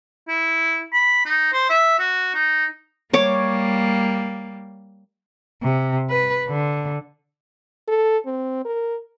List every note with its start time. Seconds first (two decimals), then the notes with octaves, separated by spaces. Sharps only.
0.28 E4
0.93 B5
1.26 D#4
1.53 C5
1.70 E5
1.99 F#4
2.35 D#4
3.13 G3 A#3 C#5 D6
5.63 C3
6.10 B4
6.48 D3
7.88 A4
8.26 C4
8.65 A#4